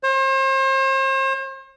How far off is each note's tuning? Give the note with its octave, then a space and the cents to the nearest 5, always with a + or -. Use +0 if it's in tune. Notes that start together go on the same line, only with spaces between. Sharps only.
C5 +40